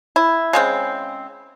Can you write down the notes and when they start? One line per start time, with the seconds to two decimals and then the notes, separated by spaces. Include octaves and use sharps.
0.16 E4
0.53 C#3 G#3 C4